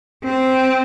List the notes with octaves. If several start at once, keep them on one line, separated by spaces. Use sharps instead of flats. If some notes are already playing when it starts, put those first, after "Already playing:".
C4